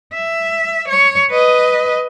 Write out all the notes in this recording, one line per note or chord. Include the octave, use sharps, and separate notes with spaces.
E5
C#5
B4 D#5